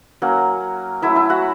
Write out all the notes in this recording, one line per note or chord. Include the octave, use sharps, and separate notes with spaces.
F#3 A#3 C#4
F#3 A3 C#4 E4 E5
E4 E5
F#4 F#5